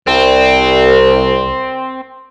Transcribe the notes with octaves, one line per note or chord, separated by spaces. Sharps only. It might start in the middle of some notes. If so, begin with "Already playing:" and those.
C2 C4